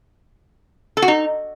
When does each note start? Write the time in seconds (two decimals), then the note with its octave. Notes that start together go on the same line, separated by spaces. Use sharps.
0.97 A4
1.02 F#4
1.08 D#4